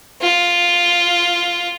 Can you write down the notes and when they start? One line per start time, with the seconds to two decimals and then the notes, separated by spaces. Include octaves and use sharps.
0.22 F4